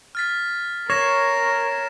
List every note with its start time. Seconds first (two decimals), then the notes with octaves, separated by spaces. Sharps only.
0.15 F6 A6 B6
0.90 A#4 C#5 A#6 C7 E7